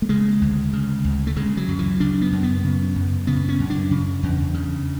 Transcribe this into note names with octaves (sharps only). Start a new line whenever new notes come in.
A3
C#3 G#3
D2
C#3
D2
A3
C#3 G#3
F#3
F#2
E3
C#3 D4
B3
F#2
B3
C#3
F#2
C#3 B3
C#4
F#2
D4
C#3
E2
C#3